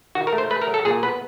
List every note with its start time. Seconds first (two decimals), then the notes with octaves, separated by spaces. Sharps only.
0.15 D#3 F#4
0.27 A#4
0.33 A3
0.38 C5
0.50 A3 B4
0.62 A#4
0.68 F#3
0.74 A4
0.85 A#2 G#4
1.03 B3 B4